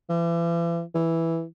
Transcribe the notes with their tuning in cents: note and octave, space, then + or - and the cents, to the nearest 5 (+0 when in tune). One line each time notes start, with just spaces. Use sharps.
E3 +40
E3 +0